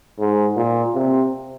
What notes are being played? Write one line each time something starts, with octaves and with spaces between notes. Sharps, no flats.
G#2
A#2
C3